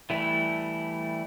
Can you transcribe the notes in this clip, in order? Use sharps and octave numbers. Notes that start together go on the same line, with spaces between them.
E3 G3 A3 E4